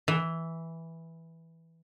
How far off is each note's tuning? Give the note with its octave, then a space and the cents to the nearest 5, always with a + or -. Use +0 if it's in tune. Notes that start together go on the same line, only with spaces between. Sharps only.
E3 -5